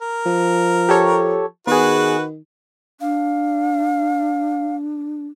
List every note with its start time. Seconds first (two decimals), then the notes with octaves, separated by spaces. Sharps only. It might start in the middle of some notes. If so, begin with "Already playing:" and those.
0.01 A#4
0.26 F3
0.89 G4 A4 C#5
1.67 D#3 B3 F#4 G#4 B4
3.01 D4 F5